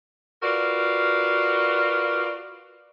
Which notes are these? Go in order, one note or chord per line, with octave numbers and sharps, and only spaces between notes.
F4 F#4 A#4 B4 D5